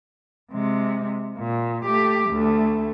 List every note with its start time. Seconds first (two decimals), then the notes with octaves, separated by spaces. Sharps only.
0.52 C3 G#3
1.38 A#2
1.86 A3 G4
2.30 D2 A3